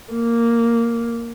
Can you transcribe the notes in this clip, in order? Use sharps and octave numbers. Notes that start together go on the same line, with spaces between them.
A#3